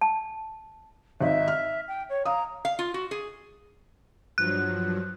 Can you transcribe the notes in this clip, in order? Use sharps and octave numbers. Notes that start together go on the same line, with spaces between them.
A5
G#1 D#4 E5
F6
G5
C#5
F5 A#5 D#6
F5
F4
F#4
G#4
G2 F3 F#3 F#6